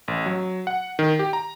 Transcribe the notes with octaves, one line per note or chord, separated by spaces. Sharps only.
A1
F#3
F#5
D#3
G4
A#5